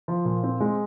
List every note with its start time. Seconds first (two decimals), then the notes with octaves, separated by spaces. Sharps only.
0.08 F3
0.25 A#2
0.43 C4
0.60 G#3